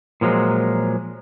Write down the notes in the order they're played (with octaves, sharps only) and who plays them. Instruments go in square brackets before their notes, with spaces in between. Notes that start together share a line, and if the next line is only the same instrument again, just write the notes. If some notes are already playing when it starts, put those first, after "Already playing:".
[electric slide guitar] A#2 F3 F#3 G#3